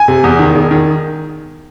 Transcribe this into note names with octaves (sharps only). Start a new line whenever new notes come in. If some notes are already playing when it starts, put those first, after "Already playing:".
Already playing: G#5
C3
E2
D#3
E1
D#3